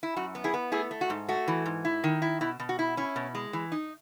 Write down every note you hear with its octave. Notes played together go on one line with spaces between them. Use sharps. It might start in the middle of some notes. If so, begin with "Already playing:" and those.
E4
F#2 F#4
B3
E4 G#4
B3
A3 E4 G#4
A3
F#4
G#2
A3 F#4
E3
G#2
E4
D#3
E4
B2 E4
B2
F#4
E4
C#4 E4
B2
G#3
E3
D#4